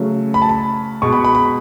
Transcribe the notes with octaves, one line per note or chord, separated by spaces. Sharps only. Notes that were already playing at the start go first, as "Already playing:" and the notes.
Already playing: C#3 F#3 A3
B5
A5
B5
B2 G#3 C#6
B5
B5
B5